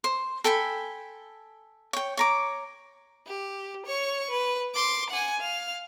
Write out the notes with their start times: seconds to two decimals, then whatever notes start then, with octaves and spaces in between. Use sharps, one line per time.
0.04 C5
0.44 A4 G5 G#5 B5
1.93 C#5 G5
2.17 C#5 A#5 D6
3.27 G4
3.85 C#5 C#6
4.30 B4
4.74 C6 D6
5.10 F#5 G#5
5.40 F5